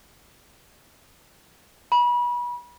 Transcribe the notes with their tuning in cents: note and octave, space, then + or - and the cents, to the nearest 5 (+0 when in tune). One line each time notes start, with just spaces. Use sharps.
B5 -30